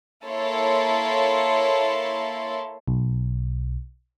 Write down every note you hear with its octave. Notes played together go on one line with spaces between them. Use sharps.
A#3 E4 A4 C#5 C6
B1